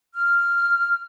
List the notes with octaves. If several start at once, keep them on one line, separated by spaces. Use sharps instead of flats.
F6